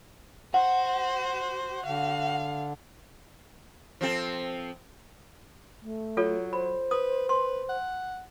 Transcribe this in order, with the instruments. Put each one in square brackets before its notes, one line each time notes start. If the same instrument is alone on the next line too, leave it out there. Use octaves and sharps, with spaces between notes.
[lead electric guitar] F#4 [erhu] C5 [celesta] F#5
[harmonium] D3 [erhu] F5
[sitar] F3 C4 A4
[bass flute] A3
[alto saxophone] F#3 [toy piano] F4 A4 C#5
[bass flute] C5 [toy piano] B5
[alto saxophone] B4 [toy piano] D#6
[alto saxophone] B4 [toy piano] C6
[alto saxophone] F#5